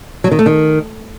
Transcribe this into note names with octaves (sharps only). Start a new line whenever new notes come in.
F#3
D#3
A3
D#3